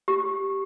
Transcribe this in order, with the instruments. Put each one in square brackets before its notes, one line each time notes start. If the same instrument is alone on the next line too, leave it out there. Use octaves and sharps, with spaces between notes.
[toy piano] G4